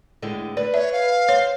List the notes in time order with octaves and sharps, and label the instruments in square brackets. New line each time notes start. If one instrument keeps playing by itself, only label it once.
[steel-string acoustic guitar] A2 D3 G#3
[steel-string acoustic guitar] B4 [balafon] D5
[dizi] C#5 [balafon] E5
[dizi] F5
[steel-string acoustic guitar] C5 [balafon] C#5